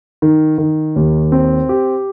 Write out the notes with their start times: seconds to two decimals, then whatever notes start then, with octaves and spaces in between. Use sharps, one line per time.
0.22 D#3
0.58 D#3
0.96 D#2
1.32 C4
1.69 G4